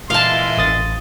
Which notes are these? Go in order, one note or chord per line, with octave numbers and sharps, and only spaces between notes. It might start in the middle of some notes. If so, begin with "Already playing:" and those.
A#2 E3 G#3 E4 F5 A5 C6
A1 D#6 A6